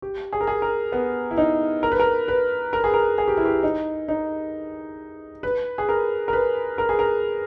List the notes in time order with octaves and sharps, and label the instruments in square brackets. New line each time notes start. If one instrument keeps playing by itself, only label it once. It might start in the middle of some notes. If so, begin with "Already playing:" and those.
[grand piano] G4
G#4
A#4
G#4
A#4
B3
E4
D#4
A#4
B4
A#4
B4
A#4
G#4
A#4
G#4
G4
E4
G4
D#4
D#4
B4
G#4
A#4
A#4
B4
A#4
G#4
A#4